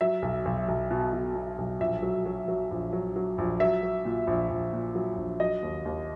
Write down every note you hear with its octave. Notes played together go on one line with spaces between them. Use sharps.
F#3 E5
B1
B1
B1
B2
B2
B2
B1
A#1 E5
F#3
F#3
F#3
A#1
F#3
F#3
A#1
F#3 E5
F#3
A#2
A#1
A#1
A#2
F#3
A#1
F#3 D#5
D#2
D#2